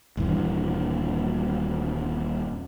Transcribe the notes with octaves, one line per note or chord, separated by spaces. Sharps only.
D#1 G2 E3